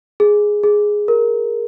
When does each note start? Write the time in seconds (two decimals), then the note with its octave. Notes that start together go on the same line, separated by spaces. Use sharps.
0.20 G#4
0.63 G#4
1.08 A#4